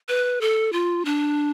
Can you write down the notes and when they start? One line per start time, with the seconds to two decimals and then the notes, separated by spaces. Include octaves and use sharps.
0.08 B4
0.41 A4
0.73 F4
1.05 D4